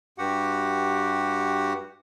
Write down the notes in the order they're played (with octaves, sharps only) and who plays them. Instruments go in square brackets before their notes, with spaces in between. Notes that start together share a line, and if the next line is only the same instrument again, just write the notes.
[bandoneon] G2 F#4 G4 F#5